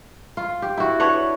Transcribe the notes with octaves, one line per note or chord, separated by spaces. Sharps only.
F4
G4
E4 F#4
D4 B4 C#5 F#5